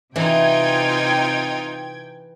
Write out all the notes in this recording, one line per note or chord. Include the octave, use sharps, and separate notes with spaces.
C3 E3 D#4 F4 G5 G#6